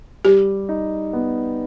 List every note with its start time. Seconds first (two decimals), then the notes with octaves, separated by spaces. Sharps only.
0.25 G3 G4
0.69 D#4
1.13 B3